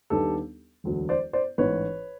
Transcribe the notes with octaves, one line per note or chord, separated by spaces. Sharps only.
D#2 D#3 G3 B3 D4 G4 A4
E1 D2 D3 F#3
C5 D5
C5 D5
A1 G#2 E3 B4 C#5